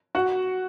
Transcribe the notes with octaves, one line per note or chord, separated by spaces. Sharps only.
F#4 F#5